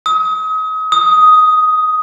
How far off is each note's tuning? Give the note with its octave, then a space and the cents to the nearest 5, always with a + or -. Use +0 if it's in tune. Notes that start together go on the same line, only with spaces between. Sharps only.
D#6 +35
D#6 +10